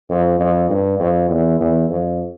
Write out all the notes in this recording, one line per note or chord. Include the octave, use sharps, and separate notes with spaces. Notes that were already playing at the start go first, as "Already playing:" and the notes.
F2
F2
G2
F2
E2
E2
F2